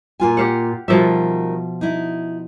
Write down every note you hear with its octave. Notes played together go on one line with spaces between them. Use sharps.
A#2 F4 G#5
G4 F5 F#5
B2 D#3 F3 G3 E5
D#4 E4